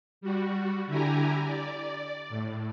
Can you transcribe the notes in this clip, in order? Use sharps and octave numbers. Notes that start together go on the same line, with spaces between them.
G3 F#4
D3 E4 G4 G#5 A#5
D5
A2